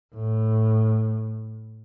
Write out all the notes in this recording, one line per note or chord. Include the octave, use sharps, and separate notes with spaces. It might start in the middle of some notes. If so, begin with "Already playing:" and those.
A2